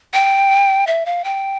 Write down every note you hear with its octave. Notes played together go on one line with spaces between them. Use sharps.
G5
E5
F5
G5